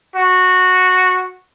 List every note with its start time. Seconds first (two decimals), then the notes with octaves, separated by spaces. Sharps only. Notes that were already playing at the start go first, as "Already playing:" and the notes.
0.16 F#4